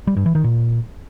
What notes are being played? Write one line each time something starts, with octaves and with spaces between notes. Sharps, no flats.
G3
G2
E3
D#3
A#2